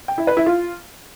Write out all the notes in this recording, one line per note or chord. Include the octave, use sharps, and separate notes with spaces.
G5
E4
B4
E4
F4